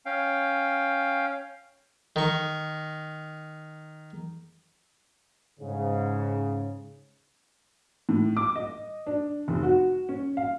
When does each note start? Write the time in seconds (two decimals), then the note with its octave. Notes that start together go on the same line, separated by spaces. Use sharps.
0.06 C#4 F5 G5
2.16 D#3 C#6
5.60 G#2 C#3
8.09 A2
8.37 D6
8.56 D#5
9.06 D4
9.48 F1
9.63 F#4
10.09 C#4
10.37 F5